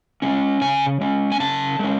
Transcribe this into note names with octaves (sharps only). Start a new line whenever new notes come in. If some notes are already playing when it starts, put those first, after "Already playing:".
G#3 C#4
C#3 G#5
G#3 C#4
G#5
C#3 A5
G#3 C#4